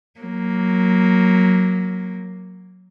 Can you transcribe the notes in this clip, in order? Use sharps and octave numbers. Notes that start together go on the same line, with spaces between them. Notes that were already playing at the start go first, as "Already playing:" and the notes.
F#3 A#3